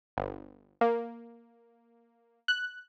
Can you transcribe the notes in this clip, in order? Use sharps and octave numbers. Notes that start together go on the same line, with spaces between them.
G1
A#3
F#6